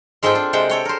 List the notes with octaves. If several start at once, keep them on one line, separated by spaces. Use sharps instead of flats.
G#2 G#3 C4 F4 A4 G5
D4
C3 G#3 F#5 G5 A5
A4 C#5 G5
A#4 C5